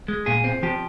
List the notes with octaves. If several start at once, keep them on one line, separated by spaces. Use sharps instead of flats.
G#3
A#2 G#4
C4
F3 G4